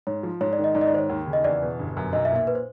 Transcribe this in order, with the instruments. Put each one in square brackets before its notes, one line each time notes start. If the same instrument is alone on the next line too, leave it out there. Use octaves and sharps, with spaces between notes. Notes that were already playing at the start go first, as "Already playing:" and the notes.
[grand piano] G#2 [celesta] C#5
[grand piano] F3
[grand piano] G#2 [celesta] C#5
[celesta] D5
[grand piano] D#3
[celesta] D#5
[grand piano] G#2 [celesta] D5
[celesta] D#5
D5
[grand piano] D#3 [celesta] C5
[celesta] C#5
[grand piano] D#2
C#3
[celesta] D#5
[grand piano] E2 [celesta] D5
[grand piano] B2
G1
F#2
[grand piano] B1 [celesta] D#5
[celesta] E5
[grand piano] A#2
[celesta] E5
B4
C5